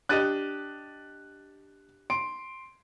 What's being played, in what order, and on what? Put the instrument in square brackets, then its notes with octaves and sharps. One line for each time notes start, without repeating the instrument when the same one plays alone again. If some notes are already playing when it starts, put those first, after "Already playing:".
[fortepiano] D4 G4 D#5 [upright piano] F#6 A6 D#7
[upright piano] C6 D7